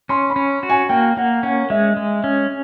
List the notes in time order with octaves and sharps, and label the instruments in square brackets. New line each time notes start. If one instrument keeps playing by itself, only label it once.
[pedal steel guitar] C#4 [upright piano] C6
[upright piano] B5
[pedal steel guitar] C#4
F#4
[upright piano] G#5
[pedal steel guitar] A#3 [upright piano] G5
[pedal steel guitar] A#3 [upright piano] F#5
[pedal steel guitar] C#4 [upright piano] F#5
[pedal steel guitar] G#3 [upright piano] E5
[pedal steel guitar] G#3
C#4